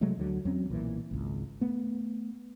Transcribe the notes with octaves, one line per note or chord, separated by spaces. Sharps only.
C3 F#3 G#3 A3
D2 D3 F3 F#3
E2 F#3 C4 C#4
B1 A#2 E3
G#1 C#2
A3 B3